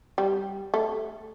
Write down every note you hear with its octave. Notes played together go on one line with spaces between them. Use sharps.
G3
A3